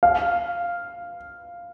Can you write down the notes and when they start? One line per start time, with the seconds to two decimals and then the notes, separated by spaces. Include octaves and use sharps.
0.03 F5